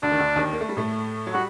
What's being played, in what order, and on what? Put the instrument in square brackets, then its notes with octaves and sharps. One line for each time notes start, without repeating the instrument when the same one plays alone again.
[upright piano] D2 D3 [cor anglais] D4
[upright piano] D#3
D2 D3
D#2 D#3
A#3
A3
G3
A2 A3
F#3
[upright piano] G3 [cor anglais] F#4